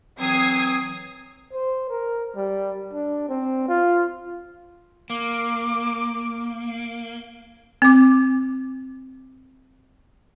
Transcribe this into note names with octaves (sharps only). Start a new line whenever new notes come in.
E3 F#3 C4 D#6 G#6 C7
C5
A#4
G3
D4
C4
F4
A#3 D6
C4 D6